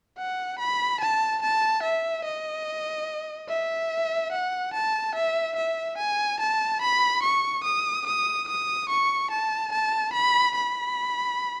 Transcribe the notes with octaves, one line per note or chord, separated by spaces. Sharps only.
F#5
B5
A5
A5
E5
D#5
E5
F#5
A5
E5
E5
G#5
A5
B5
C#6
D#6
D#6
D#6
C#6
A5
A5
B5
B5